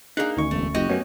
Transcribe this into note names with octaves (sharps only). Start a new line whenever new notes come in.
A#3 D4 D#4 G#4 F5 F#6
D2 D#3 C#4 C#6
E1 A3
F#1 F#4 G4 D#5
F#2 A3 B3 C#4 C#5